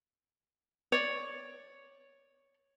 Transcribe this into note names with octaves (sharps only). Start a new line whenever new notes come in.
C#5 D5